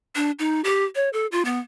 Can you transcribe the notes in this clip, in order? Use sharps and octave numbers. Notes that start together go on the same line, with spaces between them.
D4
D#4
G4
C#5
A4
F4
B3